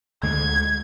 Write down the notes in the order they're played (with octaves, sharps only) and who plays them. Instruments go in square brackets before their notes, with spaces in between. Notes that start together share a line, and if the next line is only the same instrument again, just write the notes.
[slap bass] D2 D3 G#3 [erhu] G#6